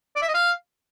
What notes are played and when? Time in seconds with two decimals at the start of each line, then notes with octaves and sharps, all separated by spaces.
0.16 D5
0.22 E5
0.28 D#5
0.34 F5